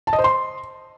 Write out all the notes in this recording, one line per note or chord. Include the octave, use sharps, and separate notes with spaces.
A5
D#5
C5
C6